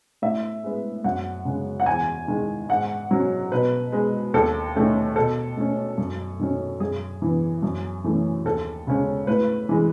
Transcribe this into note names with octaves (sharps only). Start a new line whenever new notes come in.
A2 E5
G#3 B3
F#2 F#5
C#3 G#3 C#4
F#5
E2 G#5
D#3 G#3
G#2 F#5
F#3 C#4
B2 B4
G#3 B3
D#2 A4
D#3 A3 C#4
B2 A4
A3 C#4
F#2
D#3 F#3 C#4
F#2 G#4
E3 B3
F#2
E3 A3 C#4
D#2 A4
C#3 G#3 C#4
A2 B4
E3 G#3